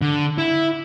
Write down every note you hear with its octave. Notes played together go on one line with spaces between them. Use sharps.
D3
E4